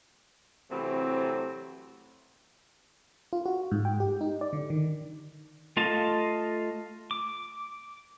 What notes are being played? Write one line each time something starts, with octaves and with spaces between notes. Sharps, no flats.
C3 E3 F#3 A3 C4
F4
F#4
G#2
G5
G4
D#4
D5
D3
D#3
A3 F4 D#5 F5 A5
D6